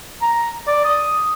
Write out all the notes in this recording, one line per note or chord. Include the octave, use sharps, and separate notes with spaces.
A#5
D5
D#6